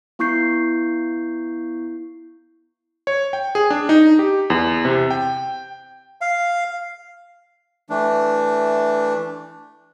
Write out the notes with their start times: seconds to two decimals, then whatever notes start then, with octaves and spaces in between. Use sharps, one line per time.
0.19 B3 E4 C#6 G6 C7
3.07 C#5
3.33 G5
3.55 G#4
3.70 D4
3.89 D#4
4.19 G4
4.50 E2
4.85 C3
5.11 G5
6.21 F5
7.90 E3 A3 D4